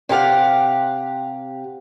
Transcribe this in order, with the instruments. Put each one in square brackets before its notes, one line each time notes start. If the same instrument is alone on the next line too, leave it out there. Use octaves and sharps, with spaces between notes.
[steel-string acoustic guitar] C3 E4 G4 F5 F#5